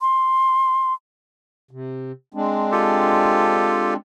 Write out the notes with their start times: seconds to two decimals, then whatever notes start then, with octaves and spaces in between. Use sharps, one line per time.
0.01 C6
1.71 C3
2.34 G#3 C4 D4
2.72 F4 G4 A4